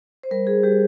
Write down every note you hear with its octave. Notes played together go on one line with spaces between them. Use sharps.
C5
G3 A#4
G#4
G3 G4